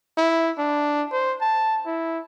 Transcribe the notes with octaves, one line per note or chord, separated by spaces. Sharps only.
E4
D4
C5
A5
E4